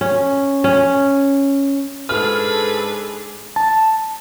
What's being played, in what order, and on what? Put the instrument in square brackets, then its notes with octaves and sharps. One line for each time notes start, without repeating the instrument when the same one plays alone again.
[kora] C#4
C#4
[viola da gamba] G#2 D4 G#4 [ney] A4 [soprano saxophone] B4 [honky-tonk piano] F6
[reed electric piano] A5